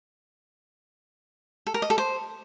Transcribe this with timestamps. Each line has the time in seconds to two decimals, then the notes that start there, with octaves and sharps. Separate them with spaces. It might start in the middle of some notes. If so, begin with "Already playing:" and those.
1.67 A4
1.74 A#4
1.82 D#5
1.90 A4
1.98 C5